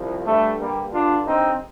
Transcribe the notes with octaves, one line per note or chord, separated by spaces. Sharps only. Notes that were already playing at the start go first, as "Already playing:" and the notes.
Already playing: C2 F3
G2 D3 G3 A3
G3 A#3
D4 F4
C4 D#4